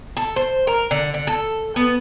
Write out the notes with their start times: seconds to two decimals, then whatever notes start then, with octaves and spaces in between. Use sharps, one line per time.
0.17 A4
0.36 C5
0.67 A#4
0.91 D3
1.14 D3
1.27 A4
1.76 B3